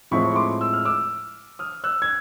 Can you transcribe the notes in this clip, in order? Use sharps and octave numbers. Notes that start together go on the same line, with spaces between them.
A2 F3 G#3 C4 E4 B5 C#6
C#6
C6 D6
E6
F6
D6 E6
D#6 F6
E6 F#6
G#6